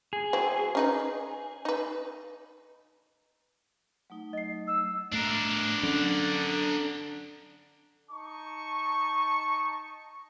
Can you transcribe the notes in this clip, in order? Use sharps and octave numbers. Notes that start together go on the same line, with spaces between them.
G#4
F#3 C4 E4
C#4 D#4 B4
D#4 B4
F#3 A3 D#4
D#5 C7
E6
A2 A3 D4 A#4
D3 F#3 C#4
D#4 A5 C#6